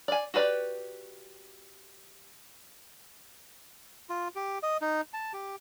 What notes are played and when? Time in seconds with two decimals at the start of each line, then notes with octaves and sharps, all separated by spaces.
0.08 D5 G#5
0.34 F#4 G4 B4 D5
4.10 F4
4.36 G4
4.63 D#5
4.82 D#4
5.13 A5
5.33 G4